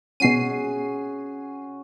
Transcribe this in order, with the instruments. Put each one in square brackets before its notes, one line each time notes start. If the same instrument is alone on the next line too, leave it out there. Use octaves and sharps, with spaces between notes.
[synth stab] B2 C7 D#7 [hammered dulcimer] C#4 F#4 G#4